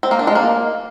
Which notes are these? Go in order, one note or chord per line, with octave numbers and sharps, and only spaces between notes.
C4
A#3
D4
G#3
A#3